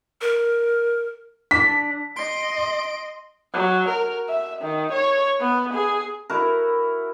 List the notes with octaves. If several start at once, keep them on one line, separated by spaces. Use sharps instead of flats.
A#4
D4 B6
D#5 C6 D7
F#3
A#4
E5
D#3
C#5
B3
G#4
E4 F#4 A#4